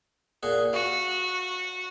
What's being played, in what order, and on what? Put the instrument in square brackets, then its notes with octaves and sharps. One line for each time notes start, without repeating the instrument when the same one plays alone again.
[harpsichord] A#2 G#4 F#5
[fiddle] F#4 [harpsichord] F5